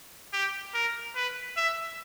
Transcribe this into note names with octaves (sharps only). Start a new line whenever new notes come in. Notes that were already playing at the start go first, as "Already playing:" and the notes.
G4
A#4
B4
E5